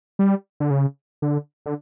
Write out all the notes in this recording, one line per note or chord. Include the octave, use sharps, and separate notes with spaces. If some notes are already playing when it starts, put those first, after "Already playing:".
G3
D3
C#3
D3
D3